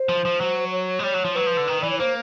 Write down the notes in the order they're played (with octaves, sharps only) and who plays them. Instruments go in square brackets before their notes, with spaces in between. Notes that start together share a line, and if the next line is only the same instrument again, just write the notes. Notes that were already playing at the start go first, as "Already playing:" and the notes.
Already playing: [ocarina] C5
[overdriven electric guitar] F3
F3
F#3
[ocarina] C#5
[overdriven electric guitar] G#3
[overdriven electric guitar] G3 [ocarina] C#5
[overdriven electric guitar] F#3
F3
[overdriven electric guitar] F#3 [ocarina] B4
[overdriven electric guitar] F3
D3
D#3
[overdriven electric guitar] E3 [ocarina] D5
[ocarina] C#5
[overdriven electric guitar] A#3 [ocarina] C5